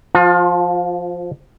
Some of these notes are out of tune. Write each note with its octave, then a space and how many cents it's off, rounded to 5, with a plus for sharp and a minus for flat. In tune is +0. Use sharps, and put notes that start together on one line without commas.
F3 +0 F4 +30